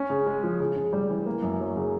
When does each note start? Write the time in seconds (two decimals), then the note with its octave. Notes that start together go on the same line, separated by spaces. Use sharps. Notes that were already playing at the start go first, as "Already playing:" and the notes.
Already playing: C#4
0.10 C#3
0.26 G#3
0.43 F3
0.60 C#3
0.76 C#3
0.93 G3
1.10 E3
1.26 A#3
1.43 F#2
1.60 F#3
1.76 C#3